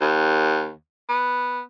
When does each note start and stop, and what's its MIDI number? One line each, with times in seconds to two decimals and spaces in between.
0.01 0.72 39
1.09 1.61 59